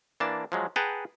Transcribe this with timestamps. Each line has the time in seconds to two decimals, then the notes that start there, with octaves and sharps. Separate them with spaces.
0.20 E3 A#3 D4 A5
0.52 F3 F#3 G#3
0.76 G#4 B4 F#5 G5 A5 A#5